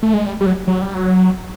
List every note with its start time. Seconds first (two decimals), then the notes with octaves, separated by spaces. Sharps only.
0.03 A3
0.14 G#3
0.26 G3
0.41 G3
0.46 F#3
0.67 F#3
0.82 G3
0.94 F#3